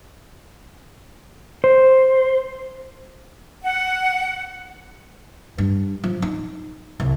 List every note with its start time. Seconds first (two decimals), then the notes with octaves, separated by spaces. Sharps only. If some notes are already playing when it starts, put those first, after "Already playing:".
1.64 C5
3.63 F#5
5.58 G2
6.04 F3
6.22 D#4
7.00 C2